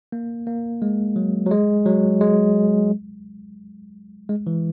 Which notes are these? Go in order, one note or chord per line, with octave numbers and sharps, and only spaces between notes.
A#3
A#3
G#3
F#3
F#3
G#3
F#3
G#3
G#3
E3